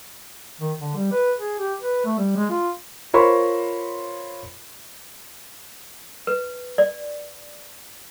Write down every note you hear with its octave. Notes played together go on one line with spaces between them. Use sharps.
D#3
D3
G3
B4
G#4
G4
B4
A3
G3
G#3
F4
F4 A#4 C5 C#5 B5 C#6
B4
D5